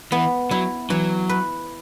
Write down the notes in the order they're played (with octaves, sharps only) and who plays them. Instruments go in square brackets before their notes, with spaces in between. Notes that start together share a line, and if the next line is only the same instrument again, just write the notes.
[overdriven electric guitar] E3 [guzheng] B3
[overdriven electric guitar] F#3 [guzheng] E4
[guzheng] E3 [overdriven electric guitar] F#3
[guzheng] B4